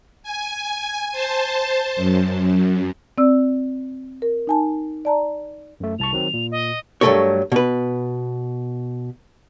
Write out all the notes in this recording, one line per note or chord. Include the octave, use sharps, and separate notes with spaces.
G#5
C5 A5
F#2
C4 D5 E6
A#4
D#4 G#5 A5
D5 A5 A#5
F#2 A3
C2 A5 C#6 F7
D#3 F#3 C4
A#2
D#5
G2 F#3 A3 A4 A#4 C#5
B2 B4